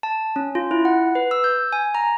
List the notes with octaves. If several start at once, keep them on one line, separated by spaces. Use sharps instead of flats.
A5
C#4
F4
E4
F#5
B4
E6
G6
G#5
A#5